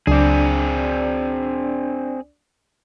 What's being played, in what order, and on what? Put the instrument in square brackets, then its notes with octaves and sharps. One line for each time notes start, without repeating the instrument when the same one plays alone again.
[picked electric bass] C#2 F#3 [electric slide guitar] C4 G#4 [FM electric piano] D4 D5